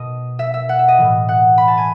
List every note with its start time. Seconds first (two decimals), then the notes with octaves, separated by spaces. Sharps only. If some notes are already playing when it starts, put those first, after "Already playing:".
Already playing: B2 D#5
0.39 E5
0.54 E5
0.69 F#5
0.79 E5
0.88 D#5
0.98 A2 E3
1.29 F#5
1.58 B5
1.68 A5
1.77 G#5